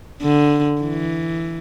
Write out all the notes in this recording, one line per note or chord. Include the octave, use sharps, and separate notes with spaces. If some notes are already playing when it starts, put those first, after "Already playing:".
D3
E3